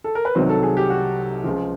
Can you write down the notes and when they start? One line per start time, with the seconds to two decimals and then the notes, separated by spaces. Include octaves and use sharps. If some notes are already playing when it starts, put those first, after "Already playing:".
0.04 A4
0.15 A#4
0.25 B4
0.35 C2 C3 D#3 F#3 C5
0.49 A4
0.63 G#4
0.77 G4
0.90 F#4
1.44 C#2 C#3 F3